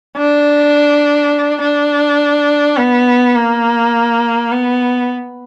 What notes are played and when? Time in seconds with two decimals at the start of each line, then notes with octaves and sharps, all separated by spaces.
0.17 D4
1.62 D4
2.77 B3
3.35 A#3
4.52 B3